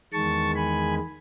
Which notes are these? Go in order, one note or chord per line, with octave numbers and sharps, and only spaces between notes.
E2 D#3 G#3 A5 C#6
G#5 B5